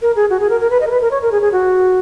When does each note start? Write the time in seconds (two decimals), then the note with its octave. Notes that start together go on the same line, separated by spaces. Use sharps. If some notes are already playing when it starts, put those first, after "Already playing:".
0.02 A#4
0.16 G#4
0.30 F#4
0.40 G#4
0.50 A#4
0.60 A#4
0.70 B4
0.81 D#5
0.87 A#4
0.91 B4
1.01 A#4
1.11 C#5
1.22 A#4
1.32 G#4
1.42 G#4
1.52 F#4